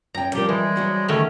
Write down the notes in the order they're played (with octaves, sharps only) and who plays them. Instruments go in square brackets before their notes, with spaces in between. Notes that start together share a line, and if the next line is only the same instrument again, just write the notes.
[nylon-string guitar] F#2 G5 [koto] A#5
[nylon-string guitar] F3 A#4 [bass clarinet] G3 [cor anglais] G4
[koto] E3 [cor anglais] G#3
[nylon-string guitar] F#3 F#4 C5
[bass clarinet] D3 [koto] D#3 A3 C#5 [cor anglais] C#4